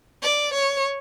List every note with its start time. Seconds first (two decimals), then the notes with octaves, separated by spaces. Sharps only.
0.23 D5
0.54 C#5